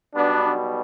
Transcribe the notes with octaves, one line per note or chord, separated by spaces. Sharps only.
B1 B2 G3 B3 D4